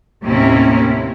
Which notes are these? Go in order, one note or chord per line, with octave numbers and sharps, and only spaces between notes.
D#2 A2 C3 A#3 C#4 E4